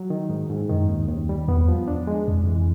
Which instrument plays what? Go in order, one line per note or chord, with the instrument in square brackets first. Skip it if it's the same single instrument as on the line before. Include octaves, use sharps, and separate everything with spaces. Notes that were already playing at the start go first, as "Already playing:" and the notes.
Already playing: [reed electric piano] F#3
D#3
G#2
G#2
[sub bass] F#2 [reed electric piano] D#3
[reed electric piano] D#2
D#2
G3
[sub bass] E2 [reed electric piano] B3
[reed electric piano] F3
D4
G#3
[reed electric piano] C2 [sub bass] F2
[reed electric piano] E3